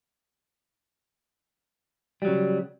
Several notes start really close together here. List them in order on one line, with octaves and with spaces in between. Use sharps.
G3 F#3 C#3